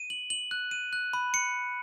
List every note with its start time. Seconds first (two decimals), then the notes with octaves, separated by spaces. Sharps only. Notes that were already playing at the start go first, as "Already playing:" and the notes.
Already playing: D#7
0.10 F#7
0.30 F#7
0.51 F#6
0.71 D#7
0.93 F#6
1.13 B5
1.34 C#7